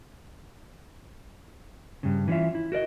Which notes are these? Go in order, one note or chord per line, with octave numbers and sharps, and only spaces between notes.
G2 C#3
E3 B3 C#4 F4 E5
E4
F#4 A#4 D5 D#5